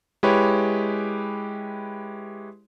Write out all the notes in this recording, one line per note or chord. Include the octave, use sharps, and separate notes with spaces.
G#3 E4 G4 B4 C#5